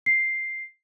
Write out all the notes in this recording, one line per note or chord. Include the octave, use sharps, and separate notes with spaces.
C7